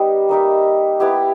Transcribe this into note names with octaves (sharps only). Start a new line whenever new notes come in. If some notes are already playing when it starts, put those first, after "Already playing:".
Already playing: G3 B3 D#4 G4
A#3 D#4 A#4 E5
B3 E4 G4